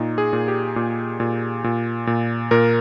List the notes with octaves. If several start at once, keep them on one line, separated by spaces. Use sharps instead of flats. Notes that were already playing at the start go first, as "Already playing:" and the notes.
Already playing: A#2 D#4
G#4
A#2
G4
A#2
A#2
A#2
A#2
A#2 A#4